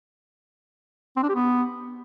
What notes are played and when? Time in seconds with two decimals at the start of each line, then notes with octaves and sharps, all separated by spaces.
1.17 C4
1.23 D4
1.29 G4
1.35 B3